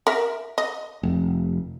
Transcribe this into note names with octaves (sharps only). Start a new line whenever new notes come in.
A#4 E5
D#5
F1